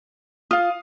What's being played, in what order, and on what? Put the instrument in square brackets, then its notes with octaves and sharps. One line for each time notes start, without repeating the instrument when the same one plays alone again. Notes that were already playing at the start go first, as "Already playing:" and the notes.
[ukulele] F4 [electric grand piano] F5 D#6